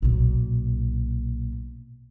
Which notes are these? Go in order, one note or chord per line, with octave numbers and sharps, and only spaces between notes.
B1 A#2